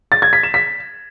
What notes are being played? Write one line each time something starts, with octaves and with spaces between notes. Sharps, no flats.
A6
G#6
B6
E7
B6